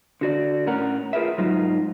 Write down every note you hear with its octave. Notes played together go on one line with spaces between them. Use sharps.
D3 F#4 D5
A2 C#4 A#4 F#5
F4 G#4 A#4 B4 E5
G#2 F#3 D#4 F4